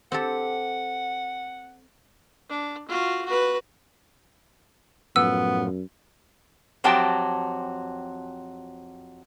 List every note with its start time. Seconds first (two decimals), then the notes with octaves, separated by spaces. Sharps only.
0.12 C4 G4 A4 F#5
2.49 D4
2.88 F4 F#4
3.25 F#4 B4
5.16 F#2 A2 F3 B3 E6
6.84 F2 F#3 C4 G4 G5 A5